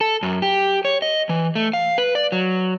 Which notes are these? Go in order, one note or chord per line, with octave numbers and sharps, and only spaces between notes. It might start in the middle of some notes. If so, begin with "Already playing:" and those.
A4
F#2
G4
C#5
D#5
E3
A3
F5
B4
D5
F#3